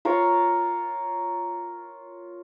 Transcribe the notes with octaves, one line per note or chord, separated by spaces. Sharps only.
F4 A#4 C#5